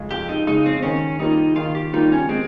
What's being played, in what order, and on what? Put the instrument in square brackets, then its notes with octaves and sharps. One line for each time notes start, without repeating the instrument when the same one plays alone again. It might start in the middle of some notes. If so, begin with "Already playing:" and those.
Already playing: [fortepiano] F2 C#3 G#3
[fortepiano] F2 [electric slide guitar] G4
[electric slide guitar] D#4
[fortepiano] C#3 G#3 [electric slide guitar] D#4
[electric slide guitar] C4
[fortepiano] D#3 [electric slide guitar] C#4
[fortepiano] G3 A#3 F4 [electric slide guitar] D#4
[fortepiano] D#3 [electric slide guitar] F4
[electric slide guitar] G4
[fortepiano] G3 A#3 F4 [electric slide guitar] D#4
[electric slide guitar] C#4
[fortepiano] G#3 [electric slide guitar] C4